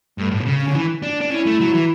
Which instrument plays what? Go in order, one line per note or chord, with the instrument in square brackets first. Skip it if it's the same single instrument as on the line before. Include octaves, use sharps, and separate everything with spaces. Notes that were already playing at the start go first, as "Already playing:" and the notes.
[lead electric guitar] G2 [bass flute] A3
[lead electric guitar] A2
B2
C#3
[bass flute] C#4
[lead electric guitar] D3
E3
D4
D4
[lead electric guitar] C#4 [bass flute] E4
[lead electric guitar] A3
F#3
E3